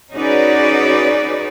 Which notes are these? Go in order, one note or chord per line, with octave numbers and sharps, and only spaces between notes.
C#4 D#4 F#4 G#4 B4 D5